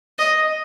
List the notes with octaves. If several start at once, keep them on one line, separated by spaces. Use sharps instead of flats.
D#5